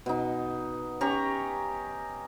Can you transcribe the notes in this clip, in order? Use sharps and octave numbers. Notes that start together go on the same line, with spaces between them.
B2 D#4
C#4 G4 A#5 C#6